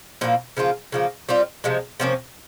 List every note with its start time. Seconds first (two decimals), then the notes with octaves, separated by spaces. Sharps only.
0.21 A#2 F3 A#3 E4
0.57 C#3 F3 A#3 F4
0.92 C#3 F3 A#3
1.29 G3 C4 F4
1.64 C3 F3 G#3
2.00 C3 F3 A#3 C#4